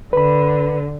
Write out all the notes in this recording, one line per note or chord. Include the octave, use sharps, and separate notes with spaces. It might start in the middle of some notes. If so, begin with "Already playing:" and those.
D3 B4 B5